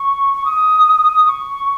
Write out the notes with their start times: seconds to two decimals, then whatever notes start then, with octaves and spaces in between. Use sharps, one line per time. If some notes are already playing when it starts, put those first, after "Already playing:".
Already playing: C#6
0.34 C#6
0.45 D#6
1.27 C#6